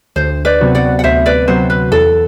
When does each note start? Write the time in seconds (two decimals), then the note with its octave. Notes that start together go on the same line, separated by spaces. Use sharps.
0.16 D2 C5
0.45 B4 D5
0.61 C3 F#3 B3 F#4
0.75 D5 F#5
0.99 F#5
1.04 D2 C5 E5
1.26 B4 D5
1.48 C3 F#3 B3 F#4 C5
1.70 B4
1.91 E2 A4